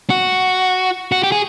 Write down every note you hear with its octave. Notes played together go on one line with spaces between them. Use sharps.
F#4
F#4
G4
G#4